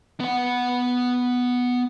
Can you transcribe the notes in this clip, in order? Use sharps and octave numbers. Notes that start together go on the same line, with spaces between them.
B3 F#5